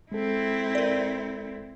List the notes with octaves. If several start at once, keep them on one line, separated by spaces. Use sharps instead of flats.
G#3 C4 E4 A4
A#4 D5